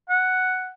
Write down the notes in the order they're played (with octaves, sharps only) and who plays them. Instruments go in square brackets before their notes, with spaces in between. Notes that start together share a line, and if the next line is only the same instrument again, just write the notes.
[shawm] F#5